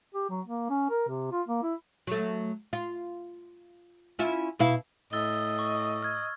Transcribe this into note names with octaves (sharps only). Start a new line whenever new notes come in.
G4
F#3
A#3
C#4
A#4
C3
F4
A#3
E4
F#3 A3
F4
C#4 E4 F4
B2 E4 F5
A2 D#5 E6 A6 G7
C#6
F6 G#6